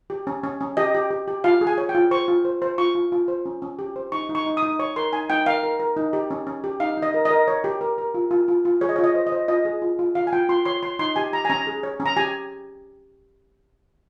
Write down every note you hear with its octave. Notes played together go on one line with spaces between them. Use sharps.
G4
C#4
C#4
C#4
G4 D#5
G4
G4
G4
F4 F5
G#4
G#5
C#5
G5
F4
C5 C#6
F4
C5
C5
F4 C#6
F4
F4
C5
C#4
C#4
G4
C5
D#4 C#6
D#4
C#6
D#4
D#6
D#4
C#5 C#6
A#4 C6
D#4 G#5
D#4 G5
A#4 F5
A#4
A#4
D#4
G4
C#4
C#4
G4
D#4 F5
D#4
D#5
A#4
D#5
A#4
C#5
G4
A#4
A#4
F4
F4
F4
F4
G#4 C#5
D#5
C#5
F4
D#5
C5
D#5
C5
F4 D#5
G#4
F4
F4
F4 F5
G#5
F4 G5
F4 C6
C#5 C6
C#5 C6
D#4 C6
G4 G#5
G4 A#5
G#5
C#4 A#5
G#4
C#5
C#4
A#5
G4 G#5